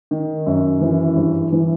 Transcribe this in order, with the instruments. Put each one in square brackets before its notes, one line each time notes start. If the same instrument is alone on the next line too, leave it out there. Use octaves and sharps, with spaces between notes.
[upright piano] D#3
F#2
E3
G2
E3